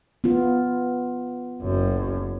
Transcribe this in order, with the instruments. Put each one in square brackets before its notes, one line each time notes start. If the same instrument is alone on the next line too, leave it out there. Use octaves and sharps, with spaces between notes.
[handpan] B3 F4
[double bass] F#1 F#2